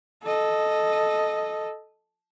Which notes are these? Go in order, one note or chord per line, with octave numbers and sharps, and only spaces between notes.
A4 D#5